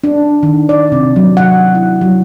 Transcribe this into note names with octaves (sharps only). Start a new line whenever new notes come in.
D4
D#3
D5
C3
F#3
F#5
E4
F#3